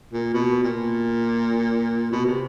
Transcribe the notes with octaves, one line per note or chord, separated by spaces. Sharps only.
A#2
B2
A#2
B2
C3